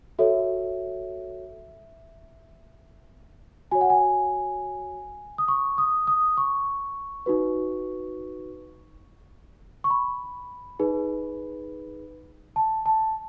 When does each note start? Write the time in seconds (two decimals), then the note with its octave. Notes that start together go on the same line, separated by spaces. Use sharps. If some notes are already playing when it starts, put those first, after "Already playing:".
0.19 F#4 A4 C#5 E5
3.71 F#4 C#5 G#5
3.81 F#5
3.90 G#5
5.38 D#6
5.48 C#6
5.78 D#6
6.07 D#6
6.37 C#6
7.26 D#4 F#4 B4
9.84 C#6
9.90 B5
10.79 D#4 G#4 B4
12.56 A5
12.86 A5